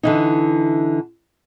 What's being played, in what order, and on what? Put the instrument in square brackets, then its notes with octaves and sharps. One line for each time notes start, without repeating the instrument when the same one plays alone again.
[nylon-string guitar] D3 E3 D#4